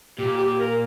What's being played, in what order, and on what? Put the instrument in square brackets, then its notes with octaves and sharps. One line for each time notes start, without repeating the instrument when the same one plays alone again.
[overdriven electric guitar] A#2 [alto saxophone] G4
[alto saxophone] G4
A#4